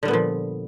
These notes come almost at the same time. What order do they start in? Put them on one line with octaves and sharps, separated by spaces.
D3 G3 B3 A#2 F3